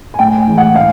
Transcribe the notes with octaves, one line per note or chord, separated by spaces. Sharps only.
G#5
A2 G5
G#5
E3 G#3
F#5
A2 F5